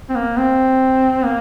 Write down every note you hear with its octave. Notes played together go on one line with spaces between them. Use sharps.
C4
A#3
C4
A#3